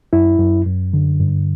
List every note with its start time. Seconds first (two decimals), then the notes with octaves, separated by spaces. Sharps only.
0.13 F#2 E4
0.39 F#2
0.66 F#2
0.93 D3
1.20 G2